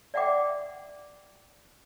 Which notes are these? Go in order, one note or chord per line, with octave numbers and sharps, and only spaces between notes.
D5 E5 F#5 G5 D6